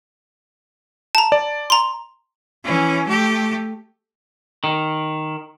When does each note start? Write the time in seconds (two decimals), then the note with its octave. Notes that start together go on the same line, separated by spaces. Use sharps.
1.15 A5 A#5
1.32 D5
1.70 A#5 C6
2.64 E3 C#4
3.08 A3 G4
4.64 D#3